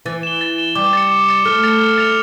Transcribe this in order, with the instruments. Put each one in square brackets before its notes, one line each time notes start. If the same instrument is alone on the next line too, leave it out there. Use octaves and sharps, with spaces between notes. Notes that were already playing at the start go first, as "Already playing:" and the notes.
[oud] E3 [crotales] A6
[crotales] E7 G7
A6
E7 G7
[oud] G3 [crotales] D6
[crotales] A6 C#7
D6
A6 C#7
[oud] A3 [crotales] F6
[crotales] A6 C#7 F7
F6
A6 C#7 F7